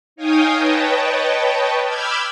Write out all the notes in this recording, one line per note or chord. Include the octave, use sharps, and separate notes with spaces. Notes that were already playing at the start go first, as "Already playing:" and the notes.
D#4 C#5 F5 G5 G#5 D#6
B4 C#5 D#5 G5 A5
B5 D6 E6 F6 G6 G#6